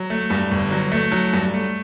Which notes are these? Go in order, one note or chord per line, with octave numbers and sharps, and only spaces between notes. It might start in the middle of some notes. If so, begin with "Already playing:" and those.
Already playing: F#3
A3
G2
G1
F#3
A3
F#3
G2
A3